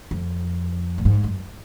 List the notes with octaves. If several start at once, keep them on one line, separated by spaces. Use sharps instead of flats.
F2
A#2
G#2
F#2